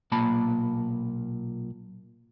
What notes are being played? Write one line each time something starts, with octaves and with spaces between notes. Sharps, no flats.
B1 A#2 A#3 A5 B5